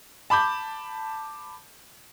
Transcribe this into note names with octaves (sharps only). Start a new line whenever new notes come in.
A5 B5 D6 G6